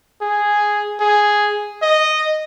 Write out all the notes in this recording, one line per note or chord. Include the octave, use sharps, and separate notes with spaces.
G#4
G#4
D#5